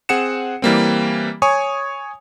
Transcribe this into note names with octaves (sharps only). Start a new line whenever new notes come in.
C4 G#4 F#5 C#7 E7
E3 G3 A#3 C4
C#5 G#5 C#6 D#6